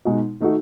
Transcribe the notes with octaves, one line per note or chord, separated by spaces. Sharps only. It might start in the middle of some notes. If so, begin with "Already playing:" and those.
B2 G#3 D#4 F#4
D#3 A3 D#4 F#4